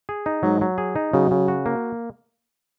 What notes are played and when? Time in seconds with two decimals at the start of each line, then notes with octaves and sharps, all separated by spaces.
0.09 G#4
0.26 D#4
0.43 G#2 F#3
0.61 F#3
0.78 G#4
0.96 D#4
1.13 C#3 F#3
1.31 C#3
1.48 F#4
1.66 A#3